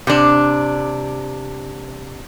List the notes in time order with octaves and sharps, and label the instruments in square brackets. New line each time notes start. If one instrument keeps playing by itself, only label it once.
[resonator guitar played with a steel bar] C3 D4